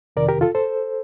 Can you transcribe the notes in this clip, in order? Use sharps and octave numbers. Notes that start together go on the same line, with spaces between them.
F2 C3 D#3 A#4 D5
G4 A#4
F4 A4
A4 C5